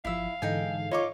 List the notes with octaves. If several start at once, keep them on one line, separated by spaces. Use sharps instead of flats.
G1 F3 E4 E5 F5
G#2 D3 E3 D#4 A4 G5 G#5
D#4 F4 C#5 C#6 D6